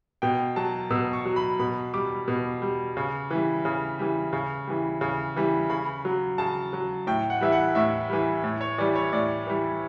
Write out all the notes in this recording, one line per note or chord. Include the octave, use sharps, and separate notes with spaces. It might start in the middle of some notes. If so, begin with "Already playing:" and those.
B2 G5
F#3 A5
B2 E6
C#6
F#3
B5
B2 B5
G3 D6
B2
G3
C#3
E3 G3
C#3
E3 G3
C#3
E3 G3
C#3
E3 G3
C#3 B5
F#3
C#3 A5
F#3
A2 G5
F#5
E3 G3 E5
F#5
A2 E5
E3 G3
A2
C#5
E3 G3 D5
C#5
A2 D5
E3 G3